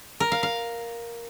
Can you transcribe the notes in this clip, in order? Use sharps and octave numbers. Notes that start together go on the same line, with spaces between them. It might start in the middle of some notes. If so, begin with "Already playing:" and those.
A#4
F5
F5